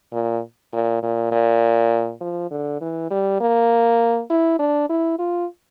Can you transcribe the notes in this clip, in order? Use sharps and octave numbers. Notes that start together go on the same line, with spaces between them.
A#2
A#2
A#2
A#2
F3
D3
E3
G3
A#3
E4
D4
E4
F4